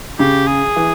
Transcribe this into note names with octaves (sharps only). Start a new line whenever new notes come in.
C#3 G4
G#4
E3